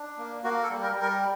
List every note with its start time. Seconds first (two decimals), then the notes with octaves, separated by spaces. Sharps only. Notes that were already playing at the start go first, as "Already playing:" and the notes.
Already playing: D4
0.18 A#3
0.44 A#3 F#4
0.63 A4
0.70 G3
0.83 A#4
0.95 G3
1.02 A#4